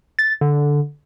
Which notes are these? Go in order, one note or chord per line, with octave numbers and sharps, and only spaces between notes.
A6
D3